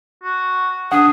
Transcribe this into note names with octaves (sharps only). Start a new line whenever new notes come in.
F#4
D4 G#4 F#5 D#6